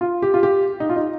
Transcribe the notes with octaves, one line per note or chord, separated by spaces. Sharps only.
F4
G4
F4
G4
D#4
F4
D#4